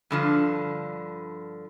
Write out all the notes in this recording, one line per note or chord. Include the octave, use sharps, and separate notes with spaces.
G2 D3 F3